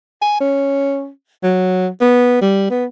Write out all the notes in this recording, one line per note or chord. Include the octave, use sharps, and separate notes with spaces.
G#5
C#4
F#3
B3
G3
B3